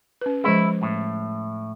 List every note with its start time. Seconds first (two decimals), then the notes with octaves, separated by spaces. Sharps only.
0.21 C#4 B4
0.44 F3 G#3 E4 G#4
0.83 A2